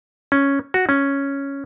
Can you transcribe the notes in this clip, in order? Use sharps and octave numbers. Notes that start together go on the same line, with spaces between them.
C#4
F#4
C#4